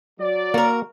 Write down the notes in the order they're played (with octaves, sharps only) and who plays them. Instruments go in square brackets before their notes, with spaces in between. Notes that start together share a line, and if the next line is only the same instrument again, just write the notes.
[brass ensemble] F#3 D5
[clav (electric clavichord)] A#3 [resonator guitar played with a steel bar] F#4 A#4